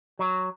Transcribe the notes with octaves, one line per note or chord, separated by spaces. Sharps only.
F#3